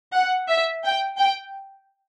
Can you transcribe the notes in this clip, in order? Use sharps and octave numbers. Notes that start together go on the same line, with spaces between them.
F#5
E5
G5
G5